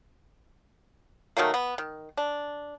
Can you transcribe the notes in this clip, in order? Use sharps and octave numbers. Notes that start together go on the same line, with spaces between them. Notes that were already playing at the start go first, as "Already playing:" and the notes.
D#3 F#3 A3 A#3
B3
D#3
D4